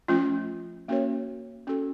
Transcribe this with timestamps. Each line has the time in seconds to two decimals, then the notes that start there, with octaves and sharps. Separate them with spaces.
0.08 F3 A3 C#4 F4
0.88 A#3 C#4 F#4 A#4 C#5
1.67 C#4 F#4 A4